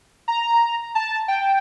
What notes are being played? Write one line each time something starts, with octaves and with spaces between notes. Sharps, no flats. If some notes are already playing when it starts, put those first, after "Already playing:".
A#5
A5
G5